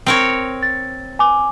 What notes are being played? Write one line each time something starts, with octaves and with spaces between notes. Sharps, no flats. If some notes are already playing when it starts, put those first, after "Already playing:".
C4 A#4 C#5
A6
G#5 D6